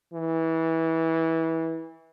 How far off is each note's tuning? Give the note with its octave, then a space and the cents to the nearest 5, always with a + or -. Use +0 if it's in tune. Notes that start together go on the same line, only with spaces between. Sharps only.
E3 -20